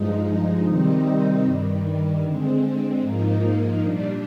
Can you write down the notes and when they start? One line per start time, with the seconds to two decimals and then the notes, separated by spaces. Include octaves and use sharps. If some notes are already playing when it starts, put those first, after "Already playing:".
Already playing: G2 F3 G#3 D#4
0.65 C3 D#3 G3 C4 D#4
1.43 G2 D#3 G3
2.22 D3 G#3 C4
3.00 G#2 F3 A#3 D#4
3.80 A#2 G3 D4